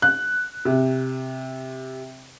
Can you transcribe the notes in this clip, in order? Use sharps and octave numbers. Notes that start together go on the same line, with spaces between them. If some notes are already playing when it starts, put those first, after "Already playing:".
F#6
C3